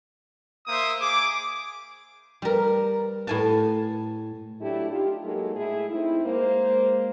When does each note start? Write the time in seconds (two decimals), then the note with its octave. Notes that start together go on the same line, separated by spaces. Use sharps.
0.67 A#3 C5 E5 D#6
1.00 G#4 D6
2.42 G3 A#4
3.27 A2 G#5 A5
4.61 F#3 A3 D4 E4 G4
4.91 D#4 F4 G4
5.24 F#3 G#3 A#3 D#4 G#4 A4
5.55 A2 E4 G#4
5.90 A3 C4 D#4 E4
6.25 G#3 A#3 C5